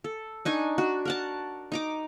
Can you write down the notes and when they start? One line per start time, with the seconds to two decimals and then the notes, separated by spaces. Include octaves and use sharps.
0.04 A4
0.45 D4 D#4 G#5 C#6
0.78 D4 F#4
1.05 A#4 F#5 A5
1.72 D#4 A#5 D6